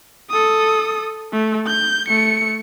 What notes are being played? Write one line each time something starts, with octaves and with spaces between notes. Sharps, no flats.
A4 D#6
A3
G6
A3 C#7